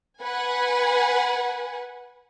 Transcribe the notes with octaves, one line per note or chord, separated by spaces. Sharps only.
B4 F#5 G#5